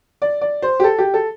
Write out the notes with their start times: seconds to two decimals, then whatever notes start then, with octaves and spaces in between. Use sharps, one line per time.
0.22 D5
0.41 D5
0.62 C5
0.80 G4
0.84 A4
0.98 G4
1.14 A4